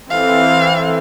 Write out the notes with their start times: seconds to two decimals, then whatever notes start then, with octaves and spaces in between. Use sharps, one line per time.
0.10 E3 C4 A4 F5